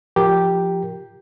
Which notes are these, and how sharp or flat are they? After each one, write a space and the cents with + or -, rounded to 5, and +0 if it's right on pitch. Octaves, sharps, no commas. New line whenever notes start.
F3 +0 G4 +0 A#4 +0